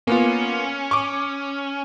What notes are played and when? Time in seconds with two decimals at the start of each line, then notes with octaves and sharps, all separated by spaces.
0.07 A#3 B3 C#4 F4
0.91 C#6 D6